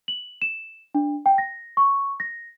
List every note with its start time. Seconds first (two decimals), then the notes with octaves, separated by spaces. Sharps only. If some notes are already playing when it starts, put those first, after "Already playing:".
0.08 F#7
0.42 E7
0.95 D4
1.26 G5
1.38 A#6
1.77 C#6
2.20 A#6